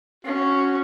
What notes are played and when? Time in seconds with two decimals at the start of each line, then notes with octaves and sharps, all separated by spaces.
0.25 C#4 F#4